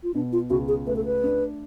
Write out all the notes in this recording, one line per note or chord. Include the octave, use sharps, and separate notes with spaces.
F4
B2 D4
F4
C#2 F#4
G#4
A3 B4
A4
B4
D4